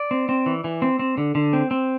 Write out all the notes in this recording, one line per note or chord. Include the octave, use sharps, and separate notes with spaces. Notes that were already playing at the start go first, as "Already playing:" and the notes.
Already playing: D5
C4
C4
E3
E3
C4
C4
D3
D3
C4
C4